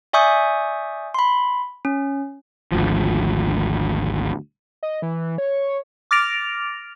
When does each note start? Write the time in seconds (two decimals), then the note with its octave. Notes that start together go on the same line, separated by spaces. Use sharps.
0.13 D5 E5 G#5 C#6 D#6 G6
1.14 B5 C6
1.85 C#4
2.72 G#1 D2 F3
4.83 D#5
5.02 E3
5.38 C#5
6.11 D6 F6 A6 A#6 D7 F7